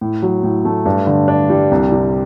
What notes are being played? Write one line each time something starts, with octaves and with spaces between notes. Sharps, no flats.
A2
F#3
A2
A3
G2
D3
D4
G3
C2
C3